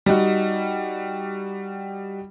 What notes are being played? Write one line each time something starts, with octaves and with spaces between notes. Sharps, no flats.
G3 D#4 F#4